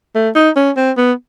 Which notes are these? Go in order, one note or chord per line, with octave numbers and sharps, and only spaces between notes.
A3
D#4
C#4
C4
B3